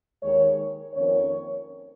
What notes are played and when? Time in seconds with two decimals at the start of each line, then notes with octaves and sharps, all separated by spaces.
0.22 D#2 D#3 G#3 C#5
0.94 F2 D#3 A#3 C#4 C#5